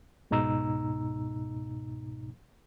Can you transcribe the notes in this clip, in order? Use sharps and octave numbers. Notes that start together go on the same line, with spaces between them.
C#2 G#2 B2 D#4 A#5 E6